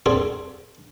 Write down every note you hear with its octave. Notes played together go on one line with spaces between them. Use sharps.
A#2 C4 G#4 A4